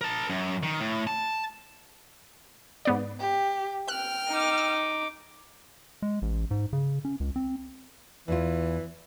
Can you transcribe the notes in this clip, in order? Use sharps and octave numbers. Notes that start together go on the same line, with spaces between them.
A#4 A5
F#2
D#3
A2
A5
G#2 B3 D5
G4
G5 F6 F#6
D#4 D6
E6
G#3
A1
G#2
C#3
C#4
C#2
C4
E2 E3 F4